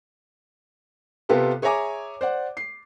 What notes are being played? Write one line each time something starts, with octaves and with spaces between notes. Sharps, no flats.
C3 B3 F4 G4 A4 B4
G#4 C#5 E5 G#5 A#5 D6
C5 D5 F#5
C7